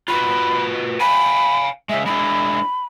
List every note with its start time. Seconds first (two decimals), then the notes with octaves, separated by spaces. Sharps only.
0.08 F4 F#4 B4 B5
1.00 F5 G5 G#5 B5
1.89 C#3 G#3 E5
2.06 G#3 D4 E4 B5